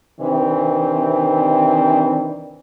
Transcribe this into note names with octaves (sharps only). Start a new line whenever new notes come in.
C3 D#3 E3 C4 D4